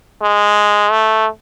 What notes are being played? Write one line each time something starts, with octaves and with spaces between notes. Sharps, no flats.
G#3
A3